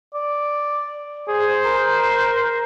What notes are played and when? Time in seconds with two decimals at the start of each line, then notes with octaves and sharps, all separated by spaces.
0.14 D5
1.28 G#4 C5
1.65 A#4